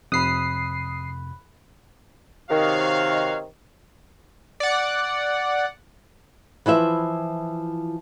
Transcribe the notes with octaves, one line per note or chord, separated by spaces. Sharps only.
F2 C3 B5 D#6 F#6 C7
C3 D#3 F#4 C#5 F5
D5 F#5
E3 F3 E4 E5